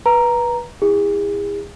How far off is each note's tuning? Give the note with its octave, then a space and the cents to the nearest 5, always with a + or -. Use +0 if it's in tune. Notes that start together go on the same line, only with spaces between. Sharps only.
B4 -20 A#5 +0
E4 -10 G#4 -40